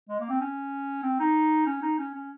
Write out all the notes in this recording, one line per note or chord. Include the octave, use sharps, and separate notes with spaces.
G#3
A#3
C4
C#4
C4
D#4
C#4
D#4
C#4
C#4